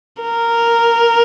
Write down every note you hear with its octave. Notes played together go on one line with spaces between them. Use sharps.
A#4